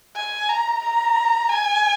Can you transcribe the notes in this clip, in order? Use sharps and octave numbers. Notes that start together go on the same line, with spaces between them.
G#5
A#5
A#5
G#5